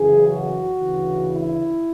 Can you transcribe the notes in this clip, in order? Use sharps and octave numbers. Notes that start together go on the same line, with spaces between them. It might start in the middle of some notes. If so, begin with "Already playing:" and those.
Already playing: F#2 C#3 E3 G#4
F#4
D2 C#3 E3
E4